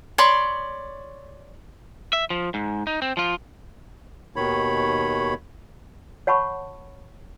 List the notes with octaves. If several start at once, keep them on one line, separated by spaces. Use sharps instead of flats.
C#5 D5 B5 C6
E5
F3
G#2
D#4
C4
F3 F4
D#2 B2 D#3 C#5 B5
C#5 F#5 A5 B5 C#6